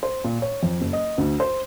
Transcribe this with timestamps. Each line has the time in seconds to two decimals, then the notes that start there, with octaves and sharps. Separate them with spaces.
0.03 C5
0.24 A#2
0.42 C#5
0.63 F2
0.81 F#1
0.93 D#5
1.18 D2
1.40 C5